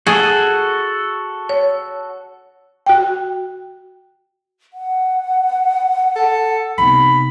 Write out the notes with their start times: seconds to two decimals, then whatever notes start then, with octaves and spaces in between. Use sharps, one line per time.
0.07 F#4 G#4 A4
1.49 C#5
2.86 F#4 G5
4.74 F#5
6.16 A4
6.78 C3 B3 D#4 B5